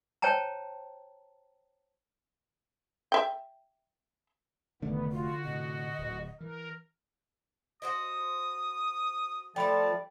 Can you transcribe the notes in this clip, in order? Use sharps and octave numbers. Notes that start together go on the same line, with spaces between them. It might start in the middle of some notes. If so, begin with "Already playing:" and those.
C5 C#5 G5 A5 A#5
E5 G5
F1 D3 D#3 A3 B3
F4 F#4
A2 C3 D#5
D1
E3 A#4
F#4 C5 D#5 D#6
F3 G3 A3 D5 G5 A5 B5